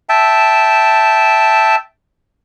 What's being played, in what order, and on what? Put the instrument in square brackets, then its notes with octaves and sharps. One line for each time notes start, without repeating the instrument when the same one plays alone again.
[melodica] E5 G5 A5